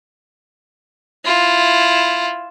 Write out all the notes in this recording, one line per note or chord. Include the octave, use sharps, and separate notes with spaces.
E4 F4